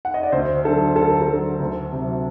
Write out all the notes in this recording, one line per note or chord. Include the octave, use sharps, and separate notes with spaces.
F#5
D#5
D5
D2 C5
D3 F#3 A4
D2 A4
A#4
A4
D3 F#3
D2
C3 F#3